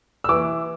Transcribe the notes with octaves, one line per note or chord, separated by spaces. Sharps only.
E6
E3 D6